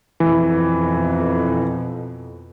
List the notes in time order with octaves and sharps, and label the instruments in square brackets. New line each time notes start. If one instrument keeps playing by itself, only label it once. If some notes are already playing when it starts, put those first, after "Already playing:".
[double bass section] F2 B2 [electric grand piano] E3